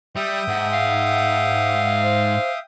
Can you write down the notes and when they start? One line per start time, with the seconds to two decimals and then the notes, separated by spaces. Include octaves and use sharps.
0.16 G3 E5 G5 D#6
0.48 G#2 F#5
0.73 F5
2.02 C5